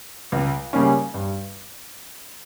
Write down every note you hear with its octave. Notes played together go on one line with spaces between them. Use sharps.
C#2
C#3 G3 A#3 C#4
G2